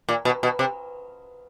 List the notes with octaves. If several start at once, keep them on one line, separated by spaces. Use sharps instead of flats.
A#2
B2
B2
C3